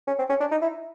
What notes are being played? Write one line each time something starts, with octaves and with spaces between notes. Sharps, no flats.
C#4
C4
C#4
D4
D#4
E4